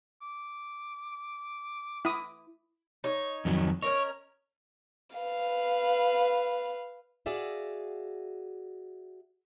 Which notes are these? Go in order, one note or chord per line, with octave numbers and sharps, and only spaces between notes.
D6
E4 D#6
D#4 C#5
F2 D#3 F#3
C#4 A#4 C#5 D#5
B4 F5
F#4 G#4 D5 E5 F5